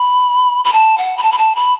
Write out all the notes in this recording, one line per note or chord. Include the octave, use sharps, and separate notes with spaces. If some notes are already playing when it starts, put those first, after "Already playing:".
Already playing: B5
B5
A5
F#5
B5
A5
B5
A5
B5